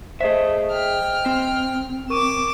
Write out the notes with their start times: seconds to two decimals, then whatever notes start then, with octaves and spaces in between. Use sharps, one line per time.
0.21 A3 G#4 C5 D#5 E5
0.72 G5 F6
1.26 C4
2.10 A#4 C#6 D6 D#7 E7